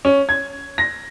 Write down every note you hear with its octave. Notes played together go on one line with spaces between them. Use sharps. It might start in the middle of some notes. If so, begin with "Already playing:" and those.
C#4
G#6
A#6